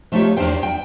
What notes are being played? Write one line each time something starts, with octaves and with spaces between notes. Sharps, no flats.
F3 A3 D#4 F4 G4 C#5
E2 G2 D4 C5 G5
G5